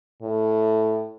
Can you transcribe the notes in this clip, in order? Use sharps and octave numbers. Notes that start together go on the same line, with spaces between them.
A2